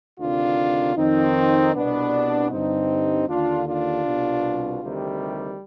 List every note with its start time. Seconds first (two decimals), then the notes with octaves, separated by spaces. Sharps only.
0.19 D2 C3 D#3 D4 F4
0.97 F2 D#3 C4 D#4
1.74 C2 B2 B3 D4
2.51 G2 D3 C4 D#4
3.28 D#2 D3 D4 F4
3.67 D4 F4
4.05 C2 B2
4.83 D2 C3 D#3 G3